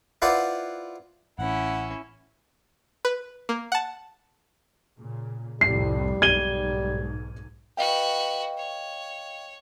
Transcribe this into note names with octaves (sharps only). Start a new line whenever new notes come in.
E4 F4 B4 C5 D5 F#5
A1 C#4 E4 F#5
B4
A#3
F#5 A5
A#2 C#3
C2 F2 A2 G3 C7
B1 G#2 G#6 D#7 G7
F#4 B4 D#5 F5 G5
C#5